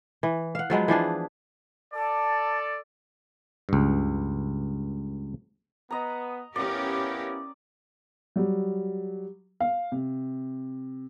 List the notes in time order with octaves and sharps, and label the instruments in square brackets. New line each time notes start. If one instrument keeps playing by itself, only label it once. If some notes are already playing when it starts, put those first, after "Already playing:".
[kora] E3
F5 F#5
F3 F#3 G#3 B3
E3 F3 D4 G#4
[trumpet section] A4 D5 [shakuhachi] A5
[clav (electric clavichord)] C#2 G2
[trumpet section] B3 [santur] D#5 A#5
[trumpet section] B3 E4 F5 [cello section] C#4 G4 A#4 [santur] D5 D#6
[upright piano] F#3 G3
F5
C3